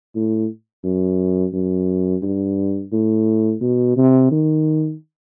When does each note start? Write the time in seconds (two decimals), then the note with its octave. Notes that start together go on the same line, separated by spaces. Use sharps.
0.15 A2
0.84 F#2
1.53 F#2
2.22 G2
2.92 A2
3.61 B2
3.97 C3
4.31 D#3